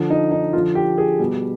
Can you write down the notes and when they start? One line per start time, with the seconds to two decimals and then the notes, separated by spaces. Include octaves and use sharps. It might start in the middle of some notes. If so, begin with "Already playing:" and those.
Already playing: D3 F3
0.10 D#4
0.31 D#4
0.53 D3 F3 F4
0.75 G4
0.98 G#4
1.19 B2 G3